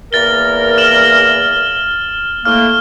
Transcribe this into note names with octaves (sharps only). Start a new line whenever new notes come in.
E2 A#3 A#4 A6 G7
F6 E7 F#7
A2 A3 A#3 F6